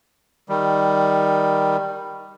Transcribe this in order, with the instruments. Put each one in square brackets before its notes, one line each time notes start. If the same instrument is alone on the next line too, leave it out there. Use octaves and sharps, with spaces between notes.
[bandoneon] D#3 G3